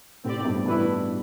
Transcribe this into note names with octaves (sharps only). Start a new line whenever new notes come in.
A2 C4 G4 D5
A2
G2 B2
G2 E3 A3 E4 B4